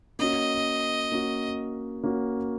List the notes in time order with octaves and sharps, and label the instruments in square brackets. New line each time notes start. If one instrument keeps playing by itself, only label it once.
[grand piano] A#3 C#4 F#4 [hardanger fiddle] D#5
[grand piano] A#3 C#4 F#4
A#3 C#4 F#4